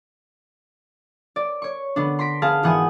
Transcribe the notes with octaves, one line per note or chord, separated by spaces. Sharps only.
D5
C#5 C#6
D3 B3 D4
C6 A#6 B6 D7
B3 G#4 F5 A5 F6
G#1 E3 B3 F#5 G#5 D#6